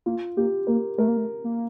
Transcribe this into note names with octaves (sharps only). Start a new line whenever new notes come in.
A#3 F4
A#3 G4
A#3 A#4
A3 A#4
A#3
A3
A#3